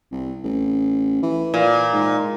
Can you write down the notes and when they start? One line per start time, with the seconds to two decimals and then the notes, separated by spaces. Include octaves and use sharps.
0.11 C2
0.44 A1
1.23 E3
1.54 A#2
1.93 G#2